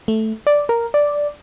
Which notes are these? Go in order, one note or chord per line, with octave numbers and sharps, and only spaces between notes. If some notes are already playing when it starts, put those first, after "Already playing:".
A3
D5
A#4
D5